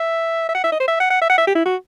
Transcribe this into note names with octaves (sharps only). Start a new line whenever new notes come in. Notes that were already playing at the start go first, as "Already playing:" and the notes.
Already playing: E5
E5
F#5
E5
D#5
C5
E5
F#5
F#5
E5
F#5
E5
G4
E4
F#4